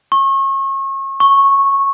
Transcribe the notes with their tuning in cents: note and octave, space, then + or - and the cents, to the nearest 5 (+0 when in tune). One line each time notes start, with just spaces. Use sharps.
C#6 -35
C#6 -10